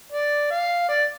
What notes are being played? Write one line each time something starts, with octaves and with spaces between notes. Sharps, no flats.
D5
F5
D5